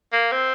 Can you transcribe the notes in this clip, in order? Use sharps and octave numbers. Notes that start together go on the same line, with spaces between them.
A#3
C4